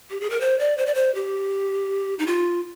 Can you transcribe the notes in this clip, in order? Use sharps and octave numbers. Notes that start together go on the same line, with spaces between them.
G4
G#4
A#4
C5
D5
C5
D5
C5
G4
D#4
F4